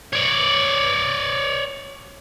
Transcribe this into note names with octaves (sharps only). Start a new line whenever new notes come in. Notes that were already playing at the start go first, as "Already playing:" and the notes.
C#5 D5